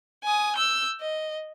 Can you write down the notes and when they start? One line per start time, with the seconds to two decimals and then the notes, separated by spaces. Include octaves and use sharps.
0.24 G#5 D#6
0.56 E6 G6
1.01 D#5